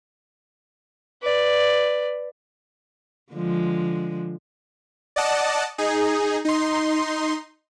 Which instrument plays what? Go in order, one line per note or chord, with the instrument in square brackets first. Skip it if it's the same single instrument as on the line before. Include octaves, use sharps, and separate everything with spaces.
[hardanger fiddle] B4 D5
[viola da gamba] D3 F3 G#3
[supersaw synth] D5 D#5 F#5 A5
D#4 G#4
D#4 C6